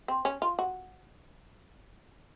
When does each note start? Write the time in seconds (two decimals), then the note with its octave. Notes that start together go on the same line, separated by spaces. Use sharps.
0.08 C4
0.25 C#4
0.42 F4
0.59 F#4